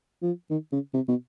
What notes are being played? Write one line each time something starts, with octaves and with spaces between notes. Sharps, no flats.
F3
D#3
C#3
C3
B2